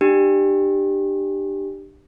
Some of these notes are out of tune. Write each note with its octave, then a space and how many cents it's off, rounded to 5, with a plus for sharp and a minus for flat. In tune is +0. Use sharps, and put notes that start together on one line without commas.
D4 +30 G4 +0